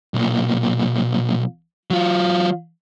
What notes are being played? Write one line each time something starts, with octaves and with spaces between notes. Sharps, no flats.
B1 A#2
F#3 F4